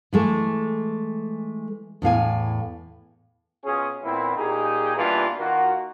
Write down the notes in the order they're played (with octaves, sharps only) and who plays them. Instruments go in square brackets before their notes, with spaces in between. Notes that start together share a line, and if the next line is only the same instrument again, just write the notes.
[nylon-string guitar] E3 G#3 A3
E2 A2 F5 G#5
[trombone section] B2 C#4 F4 G#4
A#2 E3 B3 C4 E4
A#2 D#4 G4 G#4
B2 E3 G3 A#3 D4 F4
D#3 A#3 F4 F#4